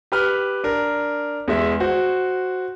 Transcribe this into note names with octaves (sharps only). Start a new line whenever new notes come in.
G4 B4 F6
D4 A#4
E2 G#3 E5
F#4 C5